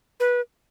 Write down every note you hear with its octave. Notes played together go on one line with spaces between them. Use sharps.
B4